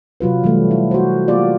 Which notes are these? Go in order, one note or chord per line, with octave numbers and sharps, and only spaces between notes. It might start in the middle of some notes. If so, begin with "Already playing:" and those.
C3 F#3 F4 B4
E3 F#3 G3 A3
E4
F#4 C5
A#3 F4 G4 D5